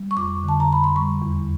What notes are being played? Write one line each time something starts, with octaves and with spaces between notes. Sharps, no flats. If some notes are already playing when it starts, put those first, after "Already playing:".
Already playing: G3
C#6
F2 D6
D3 A5
A#5
F2 B5
C6
G3 C#6
E2